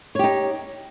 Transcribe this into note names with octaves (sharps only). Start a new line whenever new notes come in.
D#4 G4 C#5